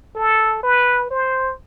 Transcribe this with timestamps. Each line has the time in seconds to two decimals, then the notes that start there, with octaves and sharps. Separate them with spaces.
0.16 A4
0.63 B4
1.11 C5